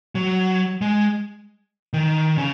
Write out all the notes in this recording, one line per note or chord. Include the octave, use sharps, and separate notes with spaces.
F#3
G#3
D#3
C#3